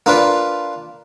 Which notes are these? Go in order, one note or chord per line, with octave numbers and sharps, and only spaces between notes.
A#3 D4 F4 B4